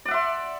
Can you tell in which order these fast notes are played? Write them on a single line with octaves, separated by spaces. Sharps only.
D5 F#5 E5 C6